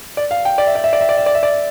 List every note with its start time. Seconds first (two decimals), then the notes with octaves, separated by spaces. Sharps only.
0.17 D5
0.31 F5
0.45 G5
0.58 D5
0.67 E5
0.75 D5
0.84 E5
0.93 D5
1.01 E5
1.09 D5
1.18 E5
1.26 D5
1.35 E5
1.43 D5
1.52 E5